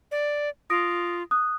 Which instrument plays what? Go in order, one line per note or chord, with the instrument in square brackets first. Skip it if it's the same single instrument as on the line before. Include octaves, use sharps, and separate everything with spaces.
[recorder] D5
[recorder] F4 [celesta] D#6 A#6 D7
[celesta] D#6 F#6